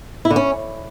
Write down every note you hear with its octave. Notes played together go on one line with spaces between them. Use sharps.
E4
D3
C#4